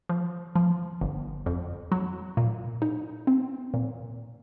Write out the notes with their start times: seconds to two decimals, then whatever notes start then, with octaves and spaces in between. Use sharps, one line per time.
0.09 F3
0.56 F3
1.01 G1
1.46 F2
1.92 F#3
2.37 A#2
2.82 D#4
3.27 C4
3.74 A#2